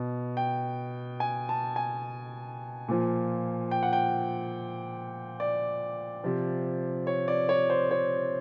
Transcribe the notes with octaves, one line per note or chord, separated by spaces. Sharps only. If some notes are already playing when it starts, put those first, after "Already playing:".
Already playing: B2
G5
G#5
A5
G#5
A#2 F3
G5
F#5
G5
D5
C3 F3
C#5
D5
C#5
C5
C#5